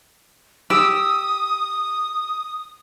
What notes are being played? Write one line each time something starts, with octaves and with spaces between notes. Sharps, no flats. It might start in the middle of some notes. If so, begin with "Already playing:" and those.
G4 D#6 E6